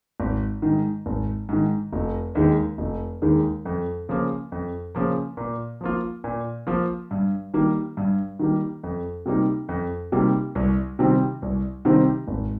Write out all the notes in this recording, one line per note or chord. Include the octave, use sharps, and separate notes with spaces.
G#1
G#2 D#3
G#1
G#2 D#3
F1
D#2 D#3 G#3
F1
D#2 D#3 G#3
F2
C#3 F3 A#3
F2
C#3 F3 A#3
A#2
F3 A#3 F4
A#2
F3 A#3 F4
G2
D#3 G3 A#3
G2
D#3 G3 A#3
F2
C3 G3 A#3 D#4
F2
C3 G3 A#3 D#4
C2
C3 D#3 G3 C4
C2
C3 D#3 G3 C4
G#1